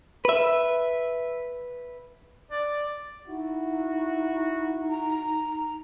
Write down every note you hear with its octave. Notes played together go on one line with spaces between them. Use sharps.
B4 E5
D5
D#4 E4 F#4
A#5